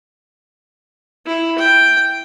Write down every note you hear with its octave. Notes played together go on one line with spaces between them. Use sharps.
E4
G5